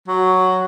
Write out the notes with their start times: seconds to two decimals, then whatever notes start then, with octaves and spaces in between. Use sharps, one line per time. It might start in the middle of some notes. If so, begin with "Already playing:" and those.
0.08 F#3